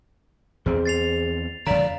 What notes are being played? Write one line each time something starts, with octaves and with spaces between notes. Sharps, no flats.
E2 C4 G#4 C5
A6 C7 F7
F2 D3 D5 F5 A#5 B6 D7